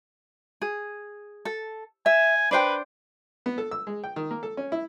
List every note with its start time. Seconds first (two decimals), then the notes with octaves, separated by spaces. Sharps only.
0.62 G#4
1.45 A4
2.06 E5 G#5
2.51 D4 B4 C5 G5
3.46 B3
3.58 A4
3.71 E6
3.87 G#3
4.04 G5
4.16 D#3
4.31 A#3
4.43 A4
4.57 C#4
4.72 E4